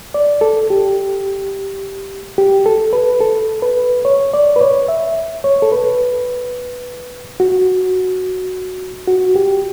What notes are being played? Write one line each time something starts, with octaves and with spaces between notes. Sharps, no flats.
D5
A4
G4
G4
A4
B4
A4
B4
C#5
D5
B4
C#5
E5
C#5
A4
B4
F#4
F#4
G4